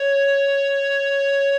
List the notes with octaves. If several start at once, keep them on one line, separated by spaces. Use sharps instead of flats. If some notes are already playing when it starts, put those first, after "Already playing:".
Already playing: C#5